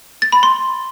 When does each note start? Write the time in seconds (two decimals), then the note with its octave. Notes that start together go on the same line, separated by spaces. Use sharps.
0.22 A6
0.32 B5
0.43 C6